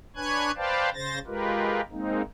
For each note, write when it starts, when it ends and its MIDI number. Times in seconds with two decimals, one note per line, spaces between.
0.16 0.51 62
0.16 0.51 71
0.16 0.51 73
0.16 0.51 80
0.16 0.51 90
0.16 0.51 92
0.56 0.90 71
0.56 0.90 72
0.56 0.90 74
0.56 0.90 77
0.56 0.90 79
0.56 0.90 81
0.94 1.19 49
0.94 1.19 72
0.94 1.19 93
0.94 1.19 94
1.27 1.81 56
1.27 1.81 65
1.27 1.81 67
1.27 1.81 70
1.27 1.81 71
1.92 2.22 56
1.92 2.22 58
1.92 2.22 60
1.92 2.22 63